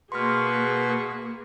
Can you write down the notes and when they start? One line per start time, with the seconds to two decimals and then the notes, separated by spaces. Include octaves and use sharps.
0.12 B2 A#3 F#4 G#4 B4 C6 C#6 F6